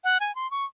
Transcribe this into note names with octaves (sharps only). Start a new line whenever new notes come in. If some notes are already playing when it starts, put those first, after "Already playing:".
F#5
G#5
C6
C#6